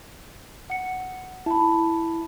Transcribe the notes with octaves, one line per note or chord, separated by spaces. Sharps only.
F#5 C#7
E4 A5 B5